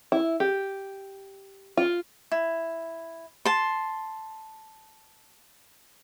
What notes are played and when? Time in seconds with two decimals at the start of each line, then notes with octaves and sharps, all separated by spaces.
0.12 E4
0.40 G4
1.77 F4
2.32 E4
3.45 A5 C6